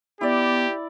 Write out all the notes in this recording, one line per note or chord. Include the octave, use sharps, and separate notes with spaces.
B3 E4 G4 D5